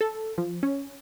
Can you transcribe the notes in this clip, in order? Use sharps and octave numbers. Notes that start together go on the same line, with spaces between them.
A4
F3
C#4